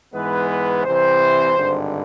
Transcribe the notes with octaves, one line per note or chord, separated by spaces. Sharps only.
G#2 E3 G#3 B3 B4
B4
C2 C3 E3 C5
G#1 G2 D3